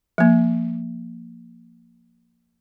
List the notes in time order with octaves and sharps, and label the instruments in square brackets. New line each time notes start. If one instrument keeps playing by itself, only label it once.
[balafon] F3 A#3